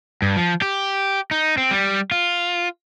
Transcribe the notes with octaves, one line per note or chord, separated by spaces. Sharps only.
G2
F3
G4
D#4
C4
G3
F4